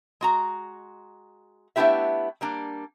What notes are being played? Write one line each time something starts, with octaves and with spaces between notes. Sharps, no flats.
G#3 F#4 A#5
A3 B3 D4 E4 G4 E5
G3 A#3 D4